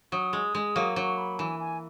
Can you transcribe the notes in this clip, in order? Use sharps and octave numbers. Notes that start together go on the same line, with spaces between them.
F#3 D#6
G#3
G#3
F#3 A#3
F#3 C#6
B5
E3 G#5
G#5